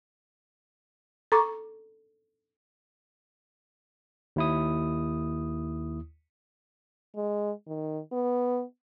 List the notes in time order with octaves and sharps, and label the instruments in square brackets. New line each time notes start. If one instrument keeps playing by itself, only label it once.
[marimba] A4 A#5 C#6 D6
[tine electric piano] D#2 E4 D#6
[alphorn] G#3
D#3
B3